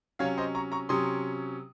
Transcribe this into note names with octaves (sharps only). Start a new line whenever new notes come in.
C3 F#3 C#4 C#5 F5
C5 D#5
A#5 C#6
A#5 C#6
C3 F#3 C#4 C6 D#6